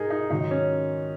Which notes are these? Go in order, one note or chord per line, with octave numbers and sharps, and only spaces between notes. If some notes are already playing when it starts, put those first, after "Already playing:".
Already playing: G#2 D#4 G#4 A#4
D#4
G#2 D#3 F#3 D#4
C#4